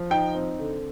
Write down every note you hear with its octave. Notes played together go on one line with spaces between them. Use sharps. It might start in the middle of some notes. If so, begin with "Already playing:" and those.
Already playing: F3
D#4 G5
C4
D3